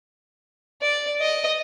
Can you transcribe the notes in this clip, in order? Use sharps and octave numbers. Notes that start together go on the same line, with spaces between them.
D5
D#5